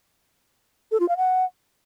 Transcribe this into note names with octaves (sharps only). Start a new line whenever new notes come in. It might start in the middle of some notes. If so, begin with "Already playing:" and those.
A4
F4
F5
F#5